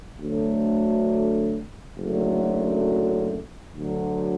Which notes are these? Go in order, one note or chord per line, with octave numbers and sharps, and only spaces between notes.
D2 D3 F#3 A3 D4
F#1 F#2 D3 F#3 A3
D2 D3 F#3